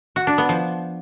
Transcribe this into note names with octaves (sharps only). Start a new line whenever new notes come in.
F#4
D4
B3
F3